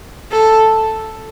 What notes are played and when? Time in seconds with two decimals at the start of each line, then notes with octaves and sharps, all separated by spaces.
0.32 A4